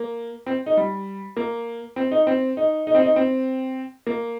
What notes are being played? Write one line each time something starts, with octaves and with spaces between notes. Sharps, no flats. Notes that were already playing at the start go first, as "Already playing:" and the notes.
Already playing: A#3
C4
D#4
G3
A#3
C4
D#4
C4
D#4
D#4
C4
D#4
C4
A#3